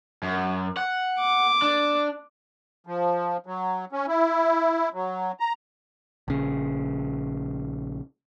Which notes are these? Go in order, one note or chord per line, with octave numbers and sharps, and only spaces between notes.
F#2
F#5
D6
D4
F3
F#3
C#4
E4
F#3
A#5
A#1 C#3